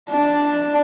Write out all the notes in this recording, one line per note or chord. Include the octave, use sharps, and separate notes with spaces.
D4